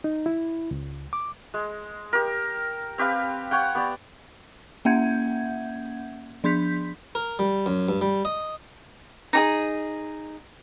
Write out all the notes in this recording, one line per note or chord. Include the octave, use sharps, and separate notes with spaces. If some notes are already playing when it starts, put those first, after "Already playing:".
D#4
E4
C#2
D6
G#3
G4 A#4
C4 G4 B4 F5
C#5 F#5 G5
B3 G4 D5
A#3 C#4 E5 F#5 G6 G#6
F3 D4 C6 G6 B6
A#4
G3
F#2
G2
G3
D#5
D#4 G4 G#4